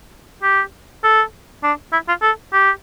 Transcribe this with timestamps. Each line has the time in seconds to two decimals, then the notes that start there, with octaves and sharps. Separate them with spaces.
0.43 G4
1.04 A4
1.63 D4
1.93 E4
2.08 F4
2.22 A4
2.53 G4